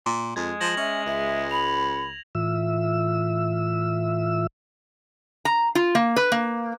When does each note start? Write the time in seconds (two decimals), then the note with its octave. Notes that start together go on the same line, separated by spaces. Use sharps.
0.06 A#2
0.36 F2 G#3 G#6
0.60 F3 G#6 A#6 F#7
0.77 C#4 E5
1.06 C#2 E5
1.51 B5 F7 F#7
2.35 A2 E3 F4 E5 E6
5.45 A#5
5.75 F4
5.95 A#3
6.16 B4
6.32 A#3